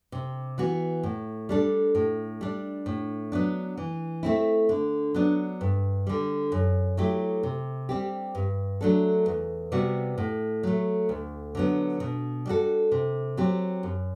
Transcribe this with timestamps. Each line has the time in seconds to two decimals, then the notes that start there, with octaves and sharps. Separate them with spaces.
0.12 C3
0.58 E3 B3 F#4
1.03 A2
1.49 G3 D4 A4
1.95 A2
2.41 G3 D4
2.86 A2
3.32 F#3 B3 D4
3.77 E3
4.23 A3 C4 E4
4.69 D3
5.14 F#3 B3 D4
5.61 G2
6.07 D3 G3
6.52 F#2
6.97 F#3 A3 E4 G4
7.43 C3
7.89 G3 C4 G4
8.35 G2
8.81 F#3 A3 D4 A4
9.26 E2
9.72 C3 G3 B3 F#4
10.18 A2
10.63 F#3 A3
11.09 D2
11.55 D3 F#3 B3
12.00 B2
12.46 G3 D4 F#4 A4
12.92 C3
13.37 F#3 C4 G4
13.83 F#2